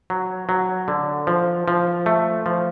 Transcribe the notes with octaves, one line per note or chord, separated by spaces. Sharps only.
F#3
F#3
D3
F3
F3
A3
F3